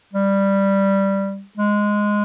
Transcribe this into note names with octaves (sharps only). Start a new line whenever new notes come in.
G3
G#3